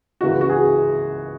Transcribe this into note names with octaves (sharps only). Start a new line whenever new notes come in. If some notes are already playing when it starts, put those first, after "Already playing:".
C#2 C#3 E3 B3 E4 F#4
F#4
G#4